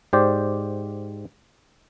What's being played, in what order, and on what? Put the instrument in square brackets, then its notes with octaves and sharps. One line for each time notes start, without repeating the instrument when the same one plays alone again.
[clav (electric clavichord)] G#2 G4 C5 D5